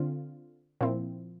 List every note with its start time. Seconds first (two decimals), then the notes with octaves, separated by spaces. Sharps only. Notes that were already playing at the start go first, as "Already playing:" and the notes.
Already playing: D3 C4 F4
0.81 A#2 F3 C4 E4